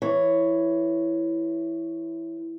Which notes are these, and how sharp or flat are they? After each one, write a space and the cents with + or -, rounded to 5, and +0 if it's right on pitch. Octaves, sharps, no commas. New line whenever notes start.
E3 +0 C#5 +0